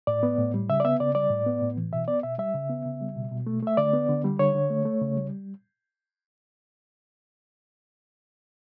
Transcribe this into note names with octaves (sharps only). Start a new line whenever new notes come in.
A2 D5
B3
A2
G3
C#3 E5
D5
B3 E5
C#3 D5
G3 D5
A2
B3
A2
E3
B2 E5
B3 D5
B2 E5
G3 E5
C#3
B3
C#3
G3
B2
B2
A3
A3 E5
D3 D5
B3
D3
G3
D3 C#5
D3
A3
A3
C#3
G3